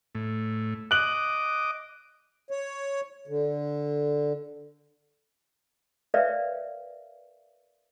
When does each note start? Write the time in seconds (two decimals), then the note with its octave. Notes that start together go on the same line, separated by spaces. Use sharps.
0.15 A2
0.91 D#5 D6 F#6 F#7
2.51 C#5
3.27 D3
6.14 A#4 B4 C#5 D5 E5 F5